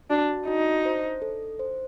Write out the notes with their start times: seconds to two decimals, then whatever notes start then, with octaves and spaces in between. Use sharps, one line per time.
0.10 D4 F#4
0.47 D#4 F#4
0.85 C5
1.22 A4
1.59 C5